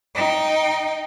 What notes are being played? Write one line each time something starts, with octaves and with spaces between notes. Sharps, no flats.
D#4 G5